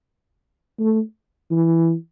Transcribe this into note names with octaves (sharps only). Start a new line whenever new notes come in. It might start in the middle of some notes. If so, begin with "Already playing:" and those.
A3
E3